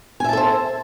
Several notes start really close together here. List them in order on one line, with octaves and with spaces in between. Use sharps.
G#5 E5 A5 A4 C5